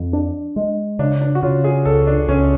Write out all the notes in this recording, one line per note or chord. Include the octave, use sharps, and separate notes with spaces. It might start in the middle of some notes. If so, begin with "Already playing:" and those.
Already playing: F2
D4
G#3
C#3 D4
D4
F#4
C#3 F4
G#4
C#2 A4
D4
C#2 C#4